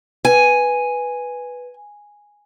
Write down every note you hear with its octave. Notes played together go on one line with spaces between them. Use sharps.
B4 G#5